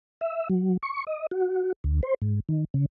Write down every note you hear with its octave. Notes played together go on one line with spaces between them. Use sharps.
E5
F#3
C#6
D#5
F#4
D2
C5
G#2
D#3
C#3